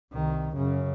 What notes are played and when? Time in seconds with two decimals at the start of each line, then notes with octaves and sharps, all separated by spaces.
0.13 C2 D#3
0.56 F#2 C#3